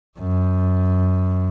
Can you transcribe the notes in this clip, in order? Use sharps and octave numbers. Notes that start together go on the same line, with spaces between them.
F#2